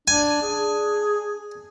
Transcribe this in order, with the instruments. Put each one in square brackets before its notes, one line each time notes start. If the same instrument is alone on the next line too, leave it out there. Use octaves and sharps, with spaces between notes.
[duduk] D4 [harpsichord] G#5
[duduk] G#4